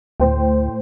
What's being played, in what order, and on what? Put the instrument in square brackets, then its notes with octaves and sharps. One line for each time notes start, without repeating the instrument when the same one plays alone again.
[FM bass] D2 [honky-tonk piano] A2 C5 G5